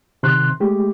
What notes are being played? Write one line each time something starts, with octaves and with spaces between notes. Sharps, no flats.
C3 D#3 C6 F#6
G#3 A3 G4